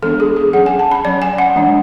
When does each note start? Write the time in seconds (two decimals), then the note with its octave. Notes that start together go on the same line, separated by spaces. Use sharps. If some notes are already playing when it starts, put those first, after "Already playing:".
0.02 E3 G#3 B3 D4 A4
0.20 G#4
0.36 G#4
0.53 F#3 C#4 F#5
0.66 G#5
0.79 A5
0.91 B5
1.05 F#3 C#4 D5
1.22 G#5
1.38 F#5
1.56 E3 G#3 D4